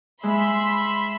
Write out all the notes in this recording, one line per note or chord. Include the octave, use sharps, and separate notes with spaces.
G#3 E5 B5 C6